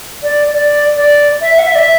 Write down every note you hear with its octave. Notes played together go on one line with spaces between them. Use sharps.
D5
D5
D5
E5
F#5
E5
D5
E5